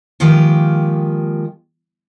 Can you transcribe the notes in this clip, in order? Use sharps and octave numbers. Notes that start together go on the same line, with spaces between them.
D#3 F3 G#3 A#3 G4